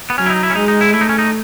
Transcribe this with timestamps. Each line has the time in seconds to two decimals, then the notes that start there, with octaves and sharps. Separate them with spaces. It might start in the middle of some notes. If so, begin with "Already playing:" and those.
0.10 B3
0.18 F#3 C#4
0.26 E4
0.30 D#4
0.43 E4
0.50 C#4
0.55 G#3 D#4
0.68 D#4
0.81 E4
0.92 A3 E4
1.01 D#4
1.09 C#4
1.19 D#4